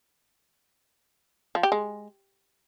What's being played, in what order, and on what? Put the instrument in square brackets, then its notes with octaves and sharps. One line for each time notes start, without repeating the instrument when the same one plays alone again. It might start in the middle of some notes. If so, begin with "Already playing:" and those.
[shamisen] F3
G4
G#3